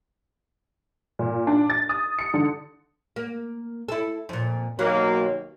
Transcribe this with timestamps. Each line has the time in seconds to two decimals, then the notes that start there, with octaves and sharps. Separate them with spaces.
1.19 A#2
1.47 D4
1.70 A6
1.89 D#6
2.19 C#7
2.34 D3
3.16 A#3
3.89 E4 A4
4.29 F2 A#2
4.79 B1 D#3 F#3 A#3